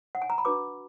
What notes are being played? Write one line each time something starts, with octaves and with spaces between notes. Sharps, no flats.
F#5
G#5
A#5
B5
D4 F#4 B4 D6